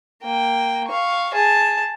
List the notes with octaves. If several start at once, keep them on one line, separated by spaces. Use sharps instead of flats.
A#3 G5
F5 C#6
G#4 A5